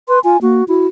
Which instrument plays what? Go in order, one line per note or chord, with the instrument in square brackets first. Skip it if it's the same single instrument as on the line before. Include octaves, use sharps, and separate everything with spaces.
[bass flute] B4 [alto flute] C6
[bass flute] F4 [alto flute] G#5
[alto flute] A#3 [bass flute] F#4
[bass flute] E4 [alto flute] F#4